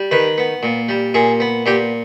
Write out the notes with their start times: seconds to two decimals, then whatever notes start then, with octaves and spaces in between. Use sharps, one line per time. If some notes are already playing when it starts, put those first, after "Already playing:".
Already playing: G3
0.11 D#3 B4
0.38 B3
0.63 A#2
0.89 G3
1.14 A#2 G#4
1.40 B3
1.66 A#2 G4